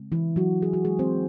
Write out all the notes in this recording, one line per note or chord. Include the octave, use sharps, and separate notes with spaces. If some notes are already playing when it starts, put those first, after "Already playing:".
Already playing: C#3 G#3 C4
E3 E4
F#3 F#4
G#4
F#4
G#3 G#4
C4 C5